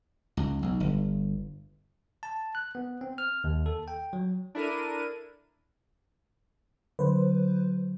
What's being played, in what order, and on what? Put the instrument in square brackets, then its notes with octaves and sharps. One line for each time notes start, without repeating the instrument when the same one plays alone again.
[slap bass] C#2
B1
G1
[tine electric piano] A5
F#6
B3
C4
F6
D#2
A4
G5
F#3
[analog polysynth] D4 E4 A4 A#4 D#7
[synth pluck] D3 F#3 [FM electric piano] B4 C5